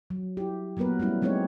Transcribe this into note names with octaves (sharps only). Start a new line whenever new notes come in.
F#3
E4 G4
F#3 A#3 B3 A#4 B4
G3 A3 C#4 E4
F#3 G#3 C4 D#4 G4 C#5